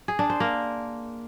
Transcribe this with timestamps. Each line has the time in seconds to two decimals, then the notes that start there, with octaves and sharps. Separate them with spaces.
0.08 G#4
0.19 D4
0.30 C5
0.40 A#3